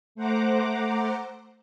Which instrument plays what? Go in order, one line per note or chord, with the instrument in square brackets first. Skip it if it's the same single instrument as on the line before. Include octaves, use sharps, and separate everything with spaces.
[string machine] A3 C5 F#5 A#5 D6